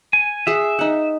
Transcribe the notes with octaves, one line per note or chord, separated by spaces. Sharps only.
G#5
G#4 E5 F#5
D#4 F#5